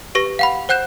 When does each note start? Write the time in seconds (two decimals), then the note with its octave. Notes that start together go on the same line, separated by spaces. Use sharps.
0.15 G4 B4 C#6 A#6
0.39 F5 F#5 B5
0.69 C5 F#5 F#6 G6 E7